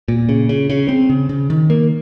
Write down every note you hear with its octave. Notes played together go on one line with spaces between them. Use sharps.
A#2
C#3
C#3
C#3
C4
C#3
C#3
D#3
A#3